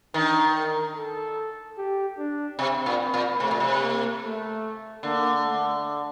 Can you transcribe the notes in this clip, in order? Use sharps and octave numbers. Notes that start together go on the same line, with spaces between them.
D#3 D4
A#4
A4
G4
D4
C3 C4
A#2
A#2
C3 A3
A#2
C3
A#3
A3
D3 A#3
A3